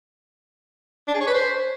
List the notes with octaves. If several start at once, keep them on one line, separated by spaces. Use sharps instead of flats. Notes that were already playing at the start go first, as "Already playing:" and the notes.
D4
G#4
C#5
B4
C5